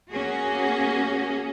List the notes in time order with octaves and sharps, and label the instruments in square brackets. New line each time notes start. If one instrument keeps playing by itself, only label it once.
[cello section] A#3 C#4 F#4 G#4